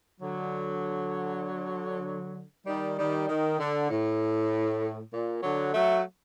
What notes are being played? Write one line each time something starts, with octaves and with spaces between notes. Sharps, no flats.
D3 F#3
D#3 G3
D#3 G3
D#3
D3
A2
A#2
D3 F#3
F#3 A3